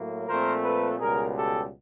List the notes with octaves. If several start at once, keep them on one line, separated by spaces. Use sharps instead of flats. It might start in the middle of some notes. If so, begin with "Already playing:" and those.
Already playing: A2 F#3 A#3
A#2 F3 A3 C4 A#4 C5
A4 B4
C#2 B2 G3 G#4 A#4
G4 A4